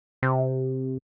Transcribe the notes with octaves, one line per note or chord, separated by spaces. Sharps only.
C3